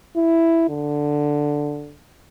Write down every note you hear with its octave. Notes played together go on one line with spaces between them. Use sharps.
E4
D3